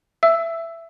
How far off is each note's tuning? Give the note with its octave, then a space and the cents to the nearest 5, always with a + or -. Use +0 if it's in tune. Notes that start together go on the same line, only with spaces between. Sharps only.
E5 +15 E6 +0